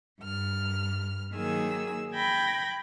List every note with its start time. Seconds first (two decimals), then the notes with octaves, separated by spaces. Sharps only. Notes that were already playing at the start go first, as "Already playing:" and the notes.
0.21 G2 F6
1.34 D#3 F#3 A#3 G#4 G#5 E6
2.14 G5 B5 G#6 A#6